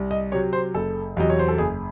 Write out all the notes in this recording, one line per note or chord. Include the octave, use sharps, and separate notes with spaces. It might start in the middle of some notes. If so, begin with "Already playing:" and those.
Already playing: C2
D#5
C3 F#3 C#5
C5
F#1 A4
E2 C3 F#3 D#5
C#5
C5
A4
F#1 G#4